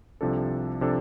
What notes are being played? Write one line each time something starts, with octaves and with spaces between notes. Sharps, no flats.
C2 C3 F3 D4 A4
C3 F3 D4 A4